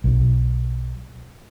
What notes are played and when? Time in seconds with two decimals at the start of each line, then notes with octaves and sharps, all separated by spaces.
0.04 B1